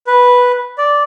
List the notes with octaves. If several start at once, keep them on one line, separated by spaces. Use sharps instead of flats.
B4
D5